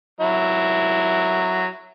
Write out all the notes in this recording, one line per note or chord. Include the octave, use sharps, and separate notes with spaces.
F#3 E4